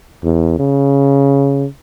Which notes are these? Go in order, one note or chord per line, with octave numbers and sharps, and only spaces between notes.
E2
C#3